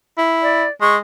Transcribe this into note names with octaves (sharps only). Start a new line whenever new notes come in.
E4
D5
G#3 C#6